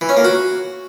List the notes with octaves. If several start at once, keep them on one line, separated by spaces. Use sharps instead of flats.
E3
C#4
A#3
F#4